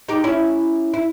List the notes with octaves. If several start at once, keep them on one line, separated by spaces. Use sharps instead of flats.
D#4 G4
C#4 E4
E4